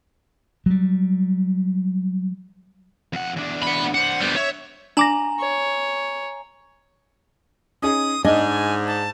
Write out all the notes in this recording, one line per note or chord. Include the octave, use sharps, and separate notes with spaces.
F#3 G3
F2 F#5
E2 D4
F#5 B5
D4 C5 F#5
G3 B3
C#5 E5
D4 G#5 A#5 D6 A#6 F#7
C#5
C#4 D#4 G#4 D#6
G#2 D4 D#5 G#5
A5